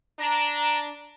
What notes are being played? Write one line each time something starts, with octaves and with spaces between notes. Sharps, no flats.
D4 A#5